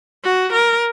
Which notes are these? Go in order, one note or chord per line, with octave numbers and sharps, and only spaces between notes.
F#4
A#4